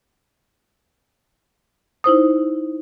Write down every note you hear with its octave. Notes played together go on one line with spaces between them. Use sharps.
D#4 E4 C5 D#6